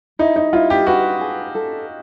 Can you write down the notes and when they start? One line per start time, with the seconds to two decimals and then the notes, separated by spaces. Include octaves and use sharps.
0.19 D#4 E4
0.36 D#4
0.53 E4 F4
0.70 G4
0.87 F#4 B4
1.21 G#4
1.55 A4